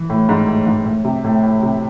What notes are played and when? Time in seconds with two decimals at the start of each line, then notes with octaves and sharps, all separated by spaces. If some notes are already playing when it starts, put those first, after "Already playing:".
Already playing: E3
0.10 A2
0.29 G#2
0.48 A2
0.66 G#2
0.86 A2
1.04 C3
1.24 A2
1.43 A2
1.62 C3